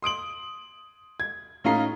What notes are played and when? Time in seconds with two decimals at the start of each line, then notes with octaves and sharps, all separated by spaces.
0.02 C6 D#6 D7 F#7
1.20 G#6
1.64 A2 C#4 D#4 F4 A#5 C7